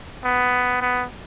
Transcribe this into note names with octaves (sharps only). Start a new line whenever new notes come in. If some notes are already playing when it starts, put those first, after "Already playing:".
B3
B3